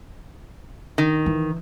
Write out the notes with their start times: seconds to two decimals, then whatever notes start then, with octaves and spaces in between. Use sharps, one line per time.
0.98 D#3
1.26 E3